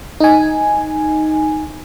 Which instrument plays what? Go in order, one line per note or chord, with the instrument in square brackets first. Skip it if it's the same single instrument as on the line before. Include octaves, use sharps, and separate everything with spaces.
[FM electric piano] D#4 G#5